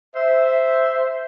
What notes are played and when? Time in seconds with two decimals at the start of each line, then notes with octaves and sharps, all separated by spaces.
0.16 C5 E5